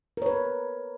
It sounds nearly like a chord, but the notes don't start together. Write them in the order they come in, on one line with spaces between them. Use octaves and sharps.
A#4 C#5 B4